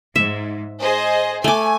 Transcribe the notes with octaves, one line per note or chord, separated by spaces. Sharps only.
G#2 E5
G#4 C5 D#5
A3 G#5 D6